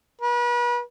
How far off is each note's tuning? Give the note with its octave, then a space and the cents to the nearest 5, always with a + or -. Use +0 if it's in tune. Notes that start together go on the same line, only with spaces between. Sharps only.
B4 -35